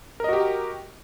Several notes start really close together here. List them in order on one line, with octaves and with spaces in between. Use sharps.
A#4 D#5 F#4 G4